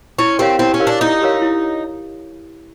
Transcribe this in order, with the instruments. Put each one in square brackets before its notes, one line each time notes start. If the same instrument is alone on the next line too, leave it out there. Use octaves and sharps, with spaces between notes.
[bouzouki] C#4 [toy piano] E4
[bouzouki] C4 [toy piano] G4 A#4 C#5 F5
[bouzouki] C4 [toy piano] E4
[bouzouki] C#4
[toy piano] G4 A#4 C#5 F5
[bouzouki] D4
[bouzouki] D#4 [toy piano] E4
[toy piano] G4 A#4 C#5 F5
E4